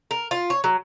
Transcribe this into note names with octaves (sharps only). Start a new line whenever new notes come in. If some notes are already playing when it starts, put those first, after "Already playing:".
A#4
F4
C#5
F#3